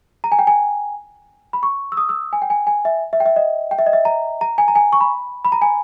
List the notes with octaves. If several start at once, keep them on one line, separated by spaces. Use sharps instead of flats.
A#5
G#5
G5
G#5
B5
C#6
E6
D#6
E6
G#5
G5
G#5
G#5
E5
E5
G5
E5
D#5
G5
E5
D#5
E5
A#5
A#5
G#5
A#5
G#5
C#6
B5
B5
A#5
G#5